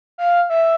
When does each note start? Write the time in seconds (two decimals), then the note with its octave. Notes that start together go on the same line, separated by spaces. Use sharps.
0.18 F5
0.50 E5